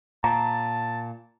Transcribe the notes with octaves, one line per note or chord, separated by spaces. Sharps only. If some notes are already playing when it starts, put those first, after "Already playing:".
A#2 A5 A#5